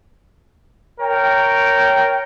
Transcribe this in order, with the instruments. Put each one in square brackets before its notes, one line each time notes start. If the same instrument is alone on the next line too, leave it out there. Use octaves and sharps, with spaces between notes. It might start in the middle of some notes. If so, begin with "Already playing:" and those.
[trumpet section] A#4 C#5 G5